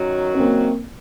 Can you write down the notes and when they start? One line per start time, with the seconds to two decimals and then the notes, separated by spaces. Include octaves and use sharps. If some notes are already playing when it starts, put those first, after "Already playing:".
Already playing: F#2 D#3 F#3
0.35 C#4
0.39 A#3 C4